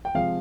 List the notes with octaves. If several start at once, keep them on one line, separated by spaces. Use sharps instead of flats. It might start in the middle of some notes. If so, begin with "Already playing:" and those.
G5
C3 F3 G#3 F5